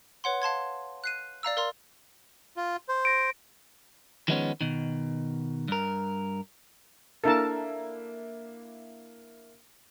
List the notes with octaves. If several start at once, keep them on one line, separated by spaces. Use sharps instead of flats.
B4 C#5 F#5 C6
F5 A5 C6 G#6
F#6 C7 D#7
D5 F5 A#5 E6
A#4 D5 F5 A#5 C6
F4
C5
A#6 D7
D#3 F3 G#3 A3 B3 C#4
B2 D#3
G2 A#4
A#3 D4 E4 A4 A#4 A5